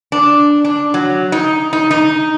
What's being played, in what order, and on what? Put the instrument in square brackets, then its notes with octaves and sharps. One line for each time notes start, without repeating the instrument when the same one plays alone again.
[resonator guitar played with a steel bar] D4
D4
F#3
D#4
D#4
D#4